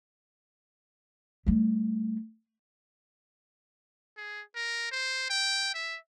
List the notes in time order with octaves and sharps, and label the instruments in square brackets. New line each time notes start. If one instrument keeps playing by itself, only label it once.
[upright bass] G3 A3
[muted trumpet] G#4
A#4
C5
G5
E5